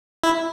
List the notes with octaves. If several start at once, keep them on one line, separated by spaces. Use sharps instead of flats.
E4